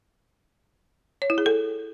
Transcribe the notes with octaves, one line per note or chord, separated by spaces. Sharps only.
C#5
E4
G#4
A4